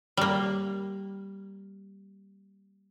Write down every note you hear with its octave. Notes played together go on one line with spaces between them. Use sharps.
G3 A#3